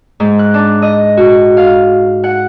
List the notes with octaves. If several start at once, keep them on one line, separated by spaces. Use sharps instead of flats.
G#2
F#6
D4
D#5
F#4
F5
F#5